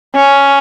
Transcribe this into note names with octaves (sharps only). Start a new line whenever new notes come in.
C#4